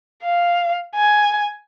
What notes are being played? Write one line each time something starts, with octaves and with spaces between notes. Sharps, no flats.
F5
G#5